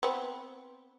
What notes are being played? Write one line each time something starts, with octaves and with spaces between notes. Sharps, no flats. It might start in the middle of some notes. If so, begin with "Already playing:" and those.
B3 C4